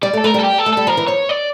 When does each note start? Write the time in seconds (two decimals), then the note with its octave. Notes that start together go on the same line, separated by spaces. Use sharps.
0.03 G3 D5
0.13 A3
0.17 A4
0.24 A3 A#4
0.34 G3
0.39 A4
0.44 G4
0.59 A4
0.66 A3
0.73 G3 A4
0.87 F3 A#4
0.97 E3
1.07 F3 C#5
1.29 D5